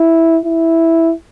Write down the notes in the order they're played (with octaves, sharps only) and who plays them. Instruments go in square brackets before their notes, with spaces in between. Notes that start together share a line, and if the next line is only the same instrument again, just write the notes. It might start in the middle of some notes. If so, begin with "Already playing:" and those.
Already playing: [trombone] E4
E4